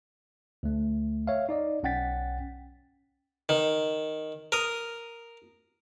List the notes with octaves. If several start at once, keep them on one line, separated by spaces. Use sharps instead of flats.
D2 A3
C#5 E5 F5
D#4 D5 D#5
B1 C#4 F#5 G5 A6 B6
D#3
A#4 D#6